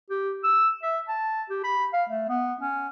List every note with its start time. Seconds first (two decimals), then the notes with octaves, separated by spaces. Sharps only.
0.10 G4
0.43 E6
0.82 E5
1.08 A5
1.49 G4
1.64 B5
1.93 F5
2.09 A3
2.29 B3
2.61 C#4